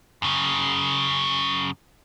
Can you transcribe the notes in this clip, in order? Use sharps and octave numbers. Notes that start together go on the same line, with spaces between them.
F#2 C#3